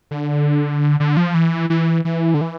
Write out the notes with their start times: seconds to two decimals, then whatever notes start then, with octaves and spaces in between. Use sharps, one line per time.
0.11 D3
1.00 D3
1.17 F3
1.34 E3
1.70 E3
2.05 E3
2.34 D3
2.41 E3